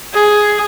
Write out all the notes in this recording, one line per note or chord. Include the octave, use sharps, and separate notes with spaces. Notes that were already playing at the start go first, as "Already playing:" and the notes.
G#4